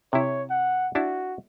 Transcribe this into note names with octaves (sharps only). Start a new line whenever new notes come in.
C3 E4 C#5
F#5
D4 E4 F#4 A5